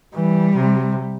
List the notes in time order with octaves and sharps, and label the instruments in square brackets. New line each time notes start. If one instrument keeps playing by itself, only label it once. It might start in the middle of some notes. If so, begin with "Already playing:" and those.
[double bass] E3 [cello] G3
[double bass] C3